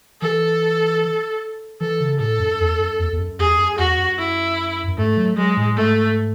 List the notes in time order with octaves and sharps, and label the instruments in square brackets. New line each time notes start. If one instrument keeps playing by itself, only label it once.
[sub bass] E3 [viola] A4
[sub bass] E3 [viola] A4
[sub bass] C#3
[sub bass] A2 [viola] A4
[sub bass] F#2
E2
F#2
E2
E2
F#2
[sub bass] E2 [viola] G#4
[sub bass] F#2
[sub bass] E2 [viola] F#4
[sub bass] F#2
[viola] E4
[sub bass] F#2
[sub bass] G#2 [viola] A3
[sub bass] F#3
[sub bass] F#3 [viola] G#3
[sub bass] A2
[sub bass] G#2 [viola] A3